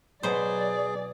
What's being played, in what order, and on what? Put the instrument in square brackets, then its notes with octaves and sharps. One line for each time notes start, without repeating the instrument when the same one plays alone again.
[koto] B2 C5 [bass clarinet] F#3 [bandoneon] G#4 [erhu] D5